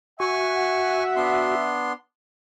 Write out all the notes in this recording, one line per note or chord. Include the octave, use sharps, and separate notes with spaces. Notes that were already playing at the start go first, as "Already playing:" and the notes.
F#4 E5 F#5 G#5 C#6
B3 D4 C6